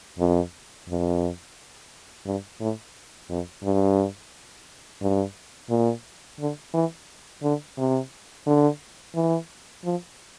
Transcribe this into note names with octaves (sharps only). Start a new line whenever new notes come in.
F2
F2
G2
A2
F2
G2
G2
A#2
D3
E3
D3
C3
D3
E3
F3